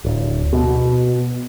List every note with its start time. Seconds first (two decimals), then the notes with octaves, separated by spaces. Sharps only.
0.04 D1
0.53 B2